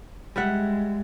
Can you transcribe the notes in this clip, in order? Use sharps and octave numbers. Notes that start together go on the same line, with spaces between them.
G3 G#3 E5 F#5